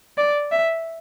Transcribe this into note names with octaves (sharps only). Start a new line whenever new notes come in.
D5
E5